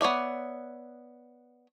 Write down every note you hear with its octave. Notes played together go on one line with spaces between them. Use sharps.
B3 C#5 D5 E5